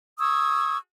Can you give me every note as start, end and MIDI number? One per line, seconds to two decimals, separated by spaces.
0.18 0.77 85
0.18 0.77 87
0.18 0.77 88
0.18 0.77 92